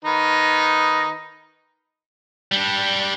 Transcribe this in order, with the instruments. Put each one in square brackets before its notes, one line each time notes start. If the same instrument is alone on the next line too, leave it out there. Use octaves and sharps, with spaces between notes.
[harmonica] D#3 D#4 B4
[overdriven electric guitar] G3 D4